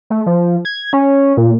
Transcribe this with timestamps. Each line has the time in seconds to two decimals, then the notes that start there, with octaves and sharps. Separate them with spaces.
0.10 A3
0.26 F3
0.65 G#6
0.93 C#4
1.37 A#2